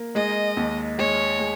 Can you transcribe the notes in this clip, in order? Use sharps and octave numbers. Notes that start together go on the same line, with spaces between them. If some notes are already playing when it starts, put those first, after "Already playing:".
Already playing: A#3
G#3 D#5
D#2
G#3 C#5
G#3